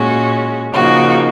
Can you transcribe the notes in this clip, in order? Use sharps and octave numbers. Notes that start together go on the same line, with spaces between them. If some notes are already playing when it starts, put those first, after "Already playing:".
Already playing: A#2 G#3 C#4 F#4
C#3 F3 A#3 D#4 F#4